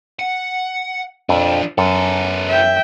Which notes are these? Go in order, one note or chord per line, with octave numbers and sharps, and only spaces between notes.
F#5
F2 F3 D4
F#2 B3 A4
E5 G5